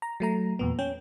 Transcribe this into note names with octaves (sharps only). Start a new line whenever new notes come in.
A#5
F#3 A3 A#5
E2 A#2 B3
C#4 G5